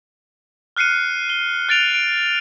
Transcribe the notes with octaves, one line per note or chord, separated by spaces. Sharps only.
F6 F#6 C7 C#7 D#7
G7
F#6 A6 D7 F7
D7